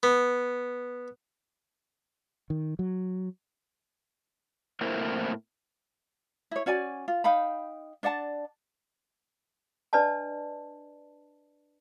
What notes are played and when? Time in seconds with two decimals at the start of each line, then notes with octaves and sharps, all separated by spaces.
0.03 B3
2.50 D#3
2.79 F#3
4.81 A2 A#3 C4 E4 A#4 C5
6.51 E4 C#5
6.66 C#4 F#4 D5 G#5
7.08 F4
7.24 D#4 F5 G5 B5
8.03 D4 D5 F#5 A5
9.93 D4 B4 D5 D#5 A5